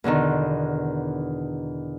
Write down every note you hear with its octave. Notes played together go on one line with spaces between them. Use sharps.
E2 B2 D3 D#3